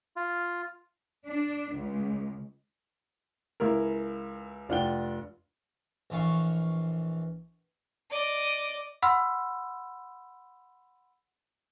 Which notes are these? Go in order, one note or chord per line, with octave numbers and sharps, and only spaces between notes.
F4
D4
C#2
C#2 E4 A#4
F1 D4 F4 F#5 G5 G7
A#1 E3 F4 F5 C#6
D5 D#5
F#5 B5 C6 E6 F6